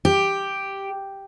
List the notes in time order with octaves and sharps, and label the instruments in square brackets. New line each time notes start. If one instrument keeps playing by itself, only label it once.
[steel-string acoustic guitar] G4